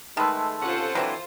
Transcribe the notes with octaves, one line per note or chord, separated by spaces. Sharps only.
D#3 G#3 A3 B4 A5 C6 E6
C3 C#4 F4 A4 C5 F#5
E3 F#3 C4 D4